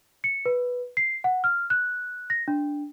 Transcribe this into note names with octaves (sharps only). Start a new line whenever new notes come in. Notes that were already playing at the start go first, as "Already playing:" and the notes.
C#7
B4
C7
F#5
F6
F#6
A#6
D4